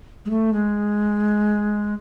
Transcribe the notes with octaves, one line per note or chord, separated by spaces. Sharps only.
G#3
A3
G#3